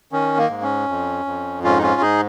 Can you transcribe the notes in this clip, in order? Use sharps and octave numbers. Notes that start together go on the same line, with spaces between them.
D#3 C#4
A#3
G#2
C#4
F2
F2
G#2 C#4 F4
D#4
C#4 F4
G#2 D#4 G#4